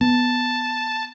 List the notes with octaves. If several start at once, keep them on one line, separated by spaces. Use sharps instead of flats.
B3 A5